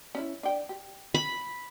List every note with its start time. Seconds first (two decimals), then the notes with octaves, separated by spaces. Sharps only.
0.15 C#4 D4 E4
0.43 D4 G5
0.69 G4
1.14 B5